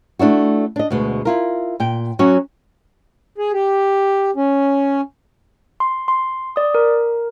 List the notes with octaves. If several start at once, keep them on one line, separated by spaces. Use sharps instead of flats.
A3 D4 E4 F#4
D4 D#5
D2 B2 G#3
E4 F4 A#4
A#2 G5
F#3 C#4 F#4
G#4
G4
C#4
C6
C6
D5 D#6
A#4